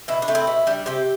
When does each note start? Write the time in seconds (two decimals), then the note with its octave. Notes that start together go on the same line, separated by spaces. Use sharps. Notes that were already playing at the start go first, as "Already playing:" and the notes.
0.08 B2 E4
0.22 D4
0.28 A3 C4
0.35 E4
0.47 B2
0.67 G3 D4
0.86 C3 G4